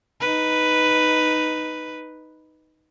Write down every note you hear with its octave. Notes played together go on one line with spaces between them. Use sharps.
D#4 B4